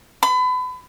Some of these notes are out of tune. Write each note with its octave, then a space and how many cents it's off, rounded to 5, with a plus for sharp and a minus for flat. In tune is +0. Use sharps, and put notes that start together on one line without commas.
B5 +30